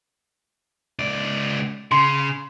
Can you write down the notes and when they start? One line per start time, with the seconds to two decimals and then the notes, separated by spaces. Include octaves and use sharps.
0.99 C#2 D5
1.92 C#3 C6